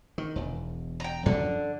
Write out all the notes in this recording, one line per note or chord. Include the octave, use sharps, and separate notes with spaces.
D#3
E1 E2
G5 A#5
F#2 D3 F3 F#3